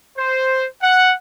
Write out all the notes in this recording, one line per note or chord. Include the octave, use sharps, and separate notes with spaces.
C5
F#5